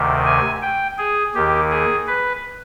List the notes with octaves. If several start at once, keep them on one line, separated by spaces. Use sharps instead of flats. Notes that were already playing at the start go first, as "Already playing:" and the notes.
Already playing: D2 C3 D#3
G#5
G5
G#4
D#2 D#3 G4
G#4
B4